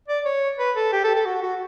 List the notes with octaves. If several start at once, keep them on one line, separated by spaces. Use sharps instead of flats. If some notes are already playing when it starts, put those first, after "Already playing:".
D5
C#5
B4
A4
G4
A4
A4
F#4
F#4